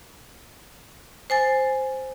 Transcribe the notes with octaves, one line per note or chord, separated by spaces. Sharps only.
C5 G#5 A6